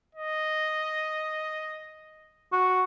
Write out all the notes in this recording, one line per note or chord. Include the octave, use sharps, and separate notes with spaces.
D#5
F#4